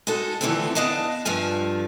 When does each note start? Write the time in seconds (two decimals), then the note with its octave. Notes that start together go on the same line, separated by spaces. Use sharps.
0.07 G#3 D#4 F#4 A4
0.41 D3 E3 F3 A3 B3 C4
0.75 B3 D4 G#4 D#5 F5 A5
1.25 G2 D3 F3 F4 G#5